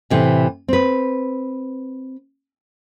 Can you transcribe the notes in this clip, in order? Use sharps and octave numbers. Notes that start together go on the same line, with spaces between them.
A2 C3 E3
C4 B4